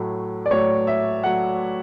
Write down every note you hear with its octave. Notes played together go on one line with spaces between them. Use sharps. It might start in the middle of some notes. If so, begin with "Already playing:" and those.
Already playing: A2 F#3 A3
D5
A2 F#3 A3 C#5
E5
F#3 A3 F#5